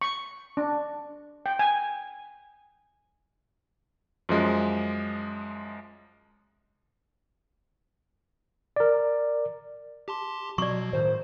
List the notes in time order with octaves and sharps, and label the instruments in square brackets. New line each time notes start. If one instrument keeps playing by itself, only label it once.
[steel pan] C#6
D4
G5
G#5
[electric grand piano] F#2 F3 G#3
[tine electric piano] A#4 D5
[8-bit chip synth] G4 A5 C6
[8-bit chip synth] B2 [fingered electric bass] F#3 [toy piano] D5 C#6
[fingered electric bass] A2 D#3 [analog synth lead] C5